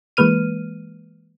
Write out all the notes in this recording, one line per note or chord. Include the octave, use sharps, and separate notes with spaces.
E3 G#3 A#3 B4 F6 D#7